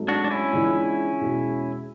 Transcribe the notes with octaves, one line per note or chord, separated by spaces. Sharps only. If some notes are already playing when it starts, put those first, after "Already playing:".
Already playing: G#1 G#2 F#3 A3
D4 F#4
D4
C#4 E4
C#2 C#3 E3 B3 D4
E2 B2 G#3